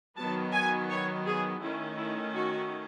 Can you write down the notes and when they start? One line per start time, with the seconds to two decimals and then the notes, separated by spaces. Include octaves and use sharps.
0.17 D#3 F#3 B3 A5
0.53 G#5
0.89 C#5
1.26 G#4
1.61 D#3 A3 C#4 E4
1.98 E4
2.34 F#4